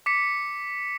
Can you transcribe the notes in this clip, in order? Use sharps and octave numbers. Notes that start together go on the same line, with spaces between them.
D6 B6 C#7